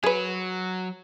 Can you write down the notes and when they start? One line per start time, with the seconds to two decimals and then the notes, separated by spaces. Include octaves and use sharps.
0.04 F#3 G#4 B4